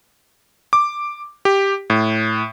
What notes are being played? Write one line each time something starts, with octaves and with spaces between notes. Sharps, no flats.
D6
G4
A2